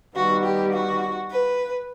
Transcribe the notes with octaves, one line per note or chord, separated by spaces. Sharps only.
D#3 G3 B3 F#4
G4
F#4
B4